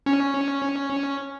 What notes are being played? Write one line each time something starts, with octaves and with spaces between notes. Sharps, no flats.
C#4